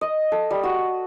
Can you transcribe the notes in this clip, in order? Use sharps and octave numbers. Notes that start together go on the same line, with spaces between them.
D#5
A4
G3
F#4